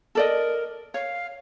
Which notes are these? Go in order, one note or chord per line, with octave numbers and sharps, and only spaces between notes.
A4 A#4 D5 D#5
C#5 F5